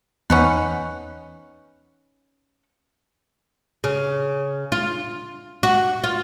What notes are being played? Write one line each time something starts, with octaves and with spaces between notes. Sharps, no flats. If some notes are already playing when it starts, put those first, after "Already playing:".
E2 C#4 D#4 B4 F#5
C#3
F4
F#4
F4